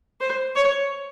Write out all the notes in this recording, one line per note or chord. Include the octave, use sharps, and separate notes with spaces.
C5
C#5